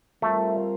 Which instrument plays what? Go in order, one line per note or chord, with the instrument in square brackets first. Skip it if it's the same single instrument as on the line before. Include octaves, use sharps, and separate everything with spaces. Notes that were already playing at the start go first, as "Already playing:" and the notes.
[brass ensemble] G3 C4 F4 A#4 [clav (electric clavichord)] A3